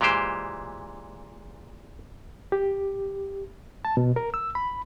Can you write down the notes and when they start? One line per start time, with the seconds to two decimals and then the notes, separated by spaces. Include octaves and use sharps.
0.01 A#2 E3 G#3 G4 C5
2.52 G4
3.85 A5
3.97 B2
4.16 A#4
4.34 E6
4.55 B5